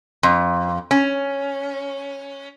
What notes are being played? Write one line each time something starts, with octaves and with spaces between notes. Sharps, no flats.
F2
C#4